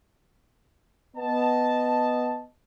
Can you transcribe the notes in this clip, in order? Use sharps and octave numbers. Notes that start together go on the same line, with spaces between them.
B3 D#5 A5